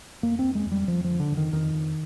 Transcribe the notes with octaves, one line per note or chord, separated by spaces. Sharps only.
F2 A#3
F2 C4
G#3
F2
G3
F2 F3
F3
D3
D3
F2
D#3
F2 D#3
F2